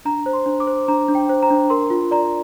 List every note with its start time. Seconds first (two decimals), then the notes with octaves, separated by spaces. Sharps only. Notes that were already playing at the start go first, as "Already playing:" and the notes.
0.05 D4 A#5
0.26 C5
0.33 C6
0.46 D4
0.60 D6
0.67 C5
0.88 D4 A#5
1.08 D4
1.15 G5
1.29 C5
1.43 A#5
1.50 D4
1.70 A#4 C6
1.90 F4
2.11 D5 A#5